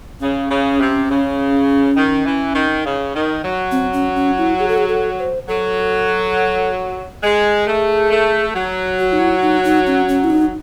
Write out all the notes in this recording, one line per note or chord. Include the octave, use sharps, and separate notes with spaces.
C#3 C#4
C#3
C3
C#3
D#3
E3
D#3
C#3
D#3
F#3
C4
C#4
C#4
E4
G#4
A4
G#4
A4
C5
F#3 A4
G#3 G#4
A3
A3
F#3
F#4
D#4
E4
D#4
D#4
C#4
C#4
E4
D#4